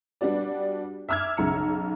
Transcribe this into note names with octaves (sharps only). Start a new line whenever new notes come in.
G3 B3 D4 F#4 D5
E5 D6 E6 F6 G#6
B1 C#3 A#5 C#7